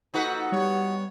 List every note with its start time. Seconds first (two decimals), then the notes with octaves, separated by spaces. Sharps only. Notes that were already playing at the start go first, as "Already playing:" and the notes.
0.14 F3 A#3 D#4 F#4 A4 B4
0.52 G3 B3 C#5